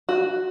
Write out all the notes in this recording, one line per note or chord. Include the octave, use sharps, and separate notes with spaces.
F#4